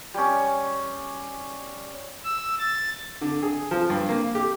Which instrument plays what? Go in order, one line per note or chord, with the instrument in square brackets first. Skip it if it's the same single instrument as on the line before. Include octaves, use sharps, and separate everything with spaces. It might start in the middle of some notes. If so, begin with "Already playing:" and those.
[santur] G3 C#4
[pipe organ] E6
A6
[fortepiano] D3
G#4
F3
G2
A#3
G4